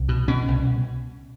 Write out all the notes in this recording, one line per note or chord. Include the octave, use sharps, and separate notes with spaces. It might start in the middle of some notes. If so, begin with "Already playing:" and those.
Already playing: C2
B2
B2 C#4
C2